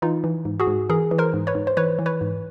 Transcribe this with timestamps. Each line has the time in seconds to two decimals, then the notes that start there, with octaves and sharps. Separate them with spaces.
0.02 E3 D#4 F4
0.24 E3
0.45 G#2
0.60 F#4 G#4
0.67 G#2
0.89 E3 G#4 A#4
1.11 E3
1.18 A#4 C5
1.34 G#2
1.47 B4 C#5
1.55 G#2
1.67 C5
1.77 E3 B4 C#5
1.99 E3
2.06 B4 C#5
2.21 G#2